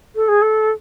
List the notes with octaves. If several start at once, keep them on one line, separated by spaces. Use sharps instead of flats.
A4
G#4
A4